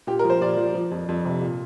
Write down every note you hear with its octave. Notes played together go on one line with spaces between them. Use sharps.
A#2 G4
A#4
F3
C5
A#2 D5
F3
F3
F2
F2
C3
A#2